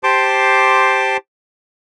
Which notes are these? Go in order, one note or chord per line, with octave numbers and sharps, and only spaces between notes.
G4 C5 A5 C6 D6